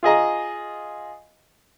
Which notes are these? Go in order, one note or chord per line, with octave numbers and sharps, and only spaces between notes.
F4 G#4 D#5 A#5